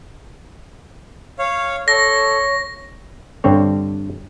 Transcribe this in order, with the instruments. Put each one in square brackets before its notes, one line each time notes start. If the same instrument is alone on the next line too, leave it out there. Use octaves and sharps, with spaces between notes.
[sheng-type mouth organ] C#5 F5
[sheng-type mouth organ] A4 [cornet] C#5 [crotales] A#6
[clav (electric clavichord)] G2 D3 C4 C#5